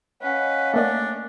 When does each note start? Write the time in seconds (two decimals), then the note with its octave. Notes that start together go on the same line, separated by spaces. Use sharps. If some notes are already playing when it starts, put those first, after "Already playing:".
0.22 C#4 B4 D#5 F5 F#5
0.74 A3 A#3 D4 D5